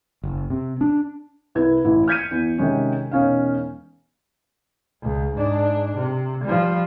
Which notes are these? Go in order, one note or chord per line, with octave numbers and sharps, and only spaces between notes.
F#1
C3
D4
C2 E4 B4 G#6
A1 E4
F6 G6 G#6 B6 C#7 D#7
E2
C3 D#3 G#3 C#4
E1 C#4 D#4 F5
C#2
G#2 D4
C3
F3 G3